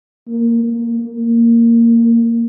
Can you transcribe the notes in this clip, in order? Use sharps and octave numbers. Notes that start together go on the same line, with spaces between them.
A#3
A#3
A#3